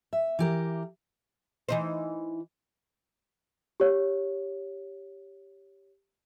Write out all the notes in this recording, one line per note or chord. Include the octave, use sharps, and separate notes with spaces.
E5
E3 G4 A#4
E3 D#4 C5
G4 C#5